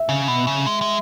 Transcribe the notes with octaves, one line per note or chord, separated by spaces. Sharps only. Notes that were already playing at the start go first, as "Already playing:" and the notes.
Already playing: E5
C#3
B2
C#3
G#3
G#3